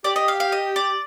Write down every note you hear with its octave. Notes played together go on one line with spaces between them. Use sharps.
G4 D5
D#5
F5
F5
D#5
D5